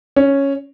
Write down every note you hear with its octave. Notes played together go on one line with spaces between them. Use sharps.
C#4